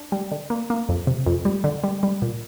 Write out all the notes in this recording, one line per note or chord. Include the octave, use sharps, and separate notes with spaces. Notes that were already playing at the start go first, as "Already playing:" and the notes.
Already playing: D4
G3
D3
A#3
A#3
F2
C3
F2
G3
D3
G3
G3
A#2